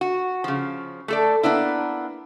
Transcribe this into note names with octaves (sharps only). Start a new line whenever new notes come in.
F#4
C#3 F3
A3 A4 D5
A#3 B3 D4 E4